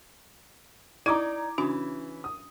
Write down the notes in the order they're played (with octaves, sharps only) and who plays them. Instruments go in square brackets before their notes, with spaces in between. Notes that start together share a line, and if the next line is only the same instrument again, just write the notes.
[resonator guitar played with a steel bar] D#4 D5 [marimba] E4 [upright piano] A#5 D6 G#6
[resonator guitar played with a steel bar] C#3 E3 [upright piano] C#4 [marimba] D4 F#4
[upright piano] D#6